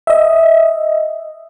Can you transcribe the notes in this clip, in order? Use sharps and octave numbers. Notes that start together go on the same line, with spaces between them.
D#5 E5